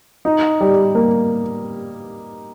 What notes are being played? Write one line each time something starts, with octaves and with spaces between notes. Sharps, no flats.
D#4
G3
A#3